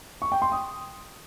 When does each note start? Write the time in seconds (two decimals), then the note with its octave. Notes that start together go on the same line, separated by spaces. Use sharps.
0.22 C#6
0.32 G5
0.42 C6
0.52 D#6